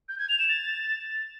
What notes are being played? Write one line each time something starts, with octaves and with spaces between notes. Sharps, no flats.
G6
G#6
F7
E7
A6